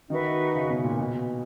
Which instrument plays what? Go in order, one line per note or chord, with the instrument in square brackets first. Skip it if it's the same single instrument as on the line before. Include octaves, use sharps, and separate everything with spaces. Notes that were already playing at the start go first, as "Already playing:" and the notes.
[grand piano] D#3 [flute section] D#4 F#4 B4 E5
[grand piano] C#3
B2
A#2
B2